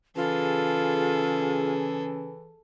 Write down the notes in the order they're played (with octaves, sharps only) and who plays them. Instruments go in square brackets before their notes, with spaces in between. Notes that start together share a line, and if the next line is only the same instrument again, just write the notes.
[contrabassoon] C#3 [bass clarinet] E3 [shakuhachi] F4 [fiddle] G#4 A4